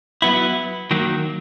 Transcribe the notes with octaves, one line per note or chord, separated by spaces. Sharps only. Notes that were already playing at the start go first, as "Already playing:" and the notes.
F#3 B3 E4
D#3 F#3 A#3